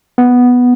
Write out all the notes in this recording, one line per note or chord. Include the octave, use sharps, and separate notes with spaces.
B3